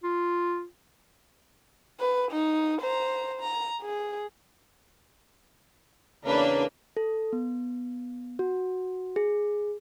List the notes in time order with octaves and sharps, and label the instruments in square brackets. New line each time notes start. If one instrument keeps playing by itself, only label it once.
[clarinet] F4
[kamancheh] B4
D#4
C5 A#5
A#5
G#4
[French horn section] E2 C#3 C#5 [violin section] A#3 D4 B4
[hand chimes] A4
B3
F#4
G#4